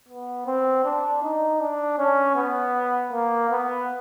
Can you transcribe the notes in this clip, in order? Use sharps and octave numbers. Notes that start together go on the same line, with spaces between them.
B3
C4
D4
D#4
D4
C#4
B3
A#3
B3